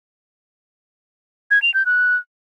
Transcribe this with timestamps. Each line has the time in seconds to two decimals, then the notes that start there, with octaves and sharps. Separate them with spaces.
1.51 G#6
1.62 F7
1.74 G6
1.86 F#6